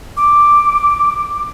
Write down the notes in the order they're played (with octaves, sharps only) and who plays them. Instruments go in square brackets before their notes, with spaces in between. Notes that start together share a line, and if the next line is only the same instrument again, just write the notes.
[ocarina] D6